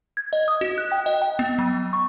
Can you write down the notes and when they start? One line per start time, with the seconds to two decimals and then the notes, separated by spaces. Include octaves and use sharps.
0.17 G#6
0.33 D#5
0.48 D#6
0.61 F#4
0.78 F#6
0.92 G5
1.06 D#5
1.22 G5
1.39 B3
1.59 F#3
1.93 C#6